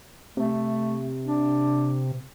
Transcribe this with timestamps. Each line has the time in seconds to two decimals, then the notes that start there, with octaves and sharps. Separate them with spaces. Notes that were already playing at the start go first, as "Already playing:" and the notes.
0.37 C3 A3
1.25 D4